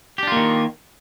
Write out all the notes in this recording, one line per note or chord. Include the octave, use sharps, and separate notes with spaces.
D#3 A#3 D4 F4 G4